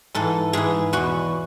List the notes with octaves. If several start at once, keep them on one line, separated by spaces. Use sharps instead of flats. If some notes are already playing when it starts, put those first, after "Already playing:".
G#2 E3 A4
G#2 E3 G#4
E2 B2 F#4